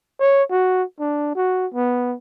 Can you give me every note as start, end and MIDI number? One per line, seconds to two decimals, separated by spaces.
0.20 0.43 73
0.51 0.83 66
1.00 1.35 62
1.36 1.67 66
1.74 2.15 59